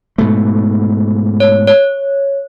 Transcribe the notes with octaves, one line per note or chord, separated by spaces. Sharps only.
G#2 B2 A3
C#5
C#5